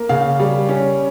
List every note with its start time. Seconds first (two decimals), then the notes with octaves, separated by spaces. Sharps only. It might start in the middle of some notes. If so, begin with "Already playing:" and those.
Already playing: A#3
0.09 C#3 F5
0.39 G3
0.69 C#4